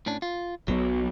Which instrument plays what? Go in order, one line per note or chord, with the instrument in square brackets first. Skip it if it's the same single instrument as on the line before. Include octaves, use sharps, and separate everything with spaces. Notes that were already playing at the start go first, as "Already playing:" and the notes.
[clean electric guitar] A2 C#4 D4
F4
[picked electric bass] B1 B2 [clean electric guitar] F#3